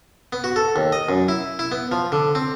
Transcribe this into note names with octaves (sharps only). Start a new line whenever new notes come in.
B3
F#4
A4
D#2
D#5
F#2
E4
E4
B3
F3
D3
C4